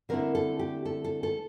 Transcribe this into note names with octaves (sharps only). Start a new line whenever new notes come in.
D3 A3 C4 E4 A#4
A4
G4
A4
A4
A4